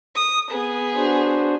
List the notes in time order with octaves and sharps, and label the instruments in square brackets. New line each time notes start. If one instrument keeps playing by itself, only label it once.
[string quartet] D#6
B3 G#4
[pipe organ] D4 F#4 C5